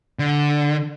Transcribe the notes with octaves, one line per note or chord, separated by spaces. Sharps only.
D3